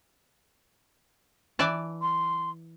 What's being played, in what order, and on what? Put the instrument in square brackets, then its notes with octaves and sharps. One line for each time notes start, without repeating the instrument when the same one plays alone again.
[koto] E3 D5 A5
[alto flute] C6